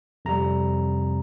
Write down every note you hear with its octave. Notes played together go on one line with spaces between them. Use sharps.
F2 C3 G3 A#5